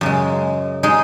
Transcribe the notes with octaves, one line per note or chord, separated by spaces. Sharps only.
F#2 C#3 G#3
G#3 D#4 G#4 D#5